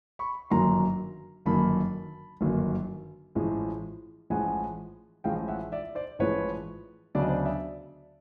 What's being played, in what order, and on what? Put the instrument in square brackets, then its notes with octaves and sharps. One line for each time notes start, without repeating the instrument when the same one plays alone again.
[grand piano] B5 C#6
G1 F#2 D#3 F#3 A#3 A#5 C6
G1 F#2 D#3 F#3 A#3 A5 B5
G1 F#2 D#3 F#3 A#3
A1 A2 F3 G#3
A1 A2 F3 G#3 F#5 G#5
A1 A2 F3 G#3 F5 G5
E5 F#5
D5 E5
C5 D5
A1 A2 F3 G#3 B4 C#5
D2 C#3 F#3 B3 D4 D5
D#5
C5 D5
D5 E5